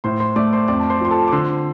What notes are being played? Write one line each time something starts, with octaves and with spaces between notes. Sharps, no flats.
A2 C5 C6
C5 C6
A3 D5 D6
C5 C6
F2 D5 D6
A5
C5 C6
F3 C6
A4 A5
D6
D3 C5 C6